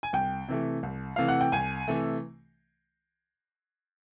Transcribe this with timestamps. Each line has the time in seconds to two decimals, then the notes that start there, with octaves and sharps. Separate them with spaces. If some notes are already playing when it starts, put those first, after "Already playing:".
0.03 G#5
0.13 C2 G5
0.48 C3 E3 A3
0.83 C2
1.16 C3 E3 A3 F5
1.28 F#5
1.41 G5
1.52 C2 G#5
1.88 C3 E3 A3